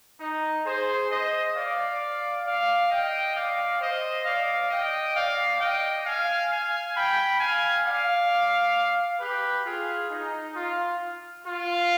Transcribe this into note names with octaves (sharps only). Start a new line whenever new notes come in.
D#4
G#4 C5
C5 D#5
D5 F5
D5 F5
D#5 G5
D5 F5
C5 D#5
D5 F5
D#5 G5
D5 F5
D#5 G5
F5 G#5
F5 G#5
G5 B5
F5 G#5
D5 F5
G4 B4
F4 G#4
D#4
F4
F4